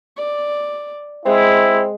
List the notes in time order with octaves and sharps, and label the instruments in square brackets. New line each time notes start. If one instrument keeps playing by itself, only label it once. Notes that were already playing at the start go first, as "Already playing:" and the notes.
[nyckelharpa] D5
[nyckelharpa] G#3 [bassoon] C4 [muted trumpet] E4